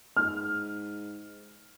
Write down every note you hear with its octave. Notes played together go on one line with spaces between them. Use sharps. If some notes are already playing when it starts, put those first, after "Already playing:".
G#2 F6